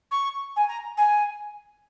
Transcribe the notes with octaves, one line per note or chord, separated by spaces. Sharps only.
C#6
G#5
A#5
G#5